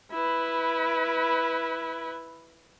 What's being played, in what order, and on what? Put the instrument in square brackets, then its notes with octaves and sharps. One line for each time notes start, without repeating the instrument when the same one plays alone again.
[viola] E4 B4